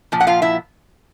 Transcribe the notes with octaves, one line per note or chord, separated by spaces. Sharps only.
A#2 F3
F#5
F4 F5
E4 E5